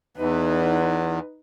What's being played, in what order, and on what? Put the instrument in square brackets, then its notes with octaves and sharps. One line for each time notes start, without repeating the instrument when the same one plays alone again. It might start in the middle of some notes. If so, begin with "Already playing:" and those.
[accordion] E2 [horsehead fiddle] D#4 B4